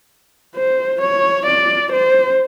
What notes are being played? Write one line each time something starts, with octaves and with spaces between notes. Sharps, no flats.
C5
C#5
D5
C5